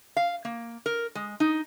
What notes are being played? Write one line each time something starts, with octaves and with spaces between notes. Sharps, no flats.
F5
A#3
A#4
G#3
D#4